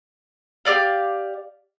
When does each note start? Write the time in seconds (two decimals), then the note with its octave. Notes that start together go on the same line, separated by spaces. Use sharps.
0.65 G4 A#4 D5 F5